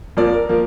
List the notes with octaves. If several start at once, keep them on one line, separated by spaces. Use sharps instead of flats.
F2 F3 A#3 D5
A#4
F3 A#3